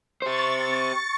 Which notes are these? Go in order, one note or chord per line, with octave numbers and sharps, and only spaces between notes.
G4 C5 C#6 A6